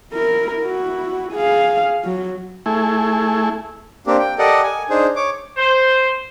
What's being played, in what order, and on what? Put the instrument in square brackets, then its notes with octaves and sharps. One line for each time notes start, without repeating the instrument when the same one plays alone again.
[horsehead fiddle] E4 A#4
E4 F#4
G#4 F5
F#3
[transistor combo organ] A3 E4 G#4
[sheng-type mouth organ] A#3 C4 D4 G4
G5
G4 A4 A#4 D5 D#5 F#5
G#5
D4 D#4 G#4 C5
C#5 D6
[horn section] C5